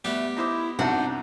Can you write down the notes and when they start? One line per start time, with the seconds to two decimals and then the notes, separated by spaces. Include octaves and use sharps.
0.05 G3 A3 B3 G4
0.37 D#4 E4 C5 D6
0.79 C2 C3 F#3 D4 D#4 F#5